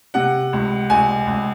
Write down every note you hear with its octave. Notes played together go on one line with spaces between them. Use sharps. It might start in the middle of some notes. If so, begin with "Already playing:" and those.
C3 F#5
C#2
C#2 G#5
C#2